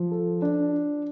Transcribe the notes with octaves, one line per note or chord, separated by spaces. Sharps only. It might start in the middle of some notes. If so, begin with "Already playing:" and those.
Already playing: F3
A4
D4